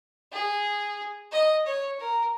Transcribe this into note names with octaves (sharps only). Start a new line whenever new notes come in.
G#4
D#5
C#5
A#4